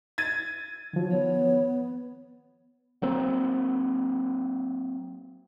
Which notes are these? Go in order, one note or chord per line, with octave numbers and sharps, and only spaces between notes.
G#6 A6 D#7
D#3 F3 F#3
B3 C#5
F#3 A#3 C4